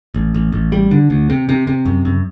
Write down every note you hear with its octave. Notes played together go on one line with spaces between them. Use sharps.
A1
A1
A1
G3
D3
D2
C3
C3
C3
F#2
F#2